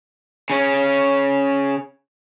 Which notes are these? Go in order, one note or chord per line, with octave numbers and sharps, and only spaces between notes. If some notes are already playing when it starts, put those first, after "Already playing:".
C#3 C#4